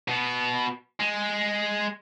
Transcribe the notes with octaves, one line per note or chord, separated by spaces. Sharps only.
B2 B3
G#3